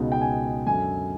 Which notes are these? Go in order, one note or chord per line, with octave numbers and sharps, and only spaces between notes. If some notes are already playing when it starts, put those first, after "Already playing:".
Already playing: C#2 B2 G#3 B3 D#4
G5
G#5
F#2 D3 F#3 G#5